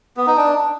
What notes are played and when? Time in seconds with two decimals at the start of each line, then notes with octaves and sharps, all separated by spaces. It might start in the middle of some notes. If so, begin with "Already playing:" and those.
0.17 B3
0.27 D#4
0.37 D4